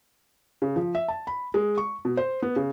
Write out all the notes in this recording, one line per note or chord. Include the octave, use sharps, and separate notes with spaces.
C#3
F3
E5
A5
B5
G#3
C#6
B2
C5
B3
C#3